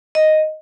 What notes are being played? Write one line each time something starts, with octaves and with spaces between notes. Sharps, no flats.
D#5